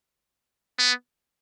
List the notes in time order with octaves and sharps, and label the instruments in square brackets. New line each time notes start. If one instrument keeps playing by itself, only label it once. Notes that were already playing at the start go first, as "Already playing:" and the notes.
[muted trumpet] B3